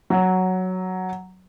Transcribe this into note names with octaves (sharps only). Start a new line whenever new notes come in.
F#3